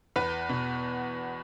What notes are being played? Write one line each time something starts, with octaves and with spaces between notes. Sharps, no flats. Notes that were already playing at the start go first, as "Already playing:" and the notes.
E2 B4
B2